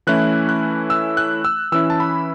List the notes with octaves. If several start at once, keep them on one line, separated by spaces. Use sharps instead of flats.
E3 A3 C#4 E4 F#6
F#6
E6
F#6
E6
E3 C#4 E4 E6
A5
B5